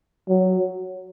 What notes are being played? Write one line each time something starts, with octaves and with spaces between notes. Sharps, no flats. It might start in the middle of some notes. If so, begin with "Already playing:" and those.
F#3